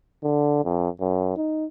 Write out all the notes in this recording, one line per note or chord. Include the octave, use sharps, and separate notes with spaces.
D3
F2
F#2
D#4